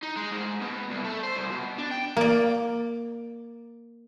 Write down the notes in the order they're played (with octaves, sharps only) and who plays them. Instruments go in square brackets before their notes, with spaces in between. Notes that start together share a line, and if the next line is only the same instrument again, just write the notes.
[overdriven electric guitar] D#4
G#3
G#2
B2
C2
A3
C5
C2
B2
D4
G5
[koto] A#3 D5